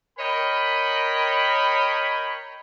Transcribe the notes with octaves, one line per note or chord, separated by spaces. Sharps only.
A#4 C#5 D#5 G5 B5